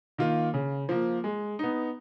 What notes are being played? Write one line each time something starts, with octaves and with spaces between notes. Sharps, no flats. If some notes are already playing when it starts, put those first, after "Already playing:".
D#3 A#3 F4
C#3
F3 A#3
G#3
B3 D#4